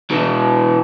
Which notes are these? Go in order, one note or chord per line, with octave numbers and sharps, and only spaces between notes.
B2 E3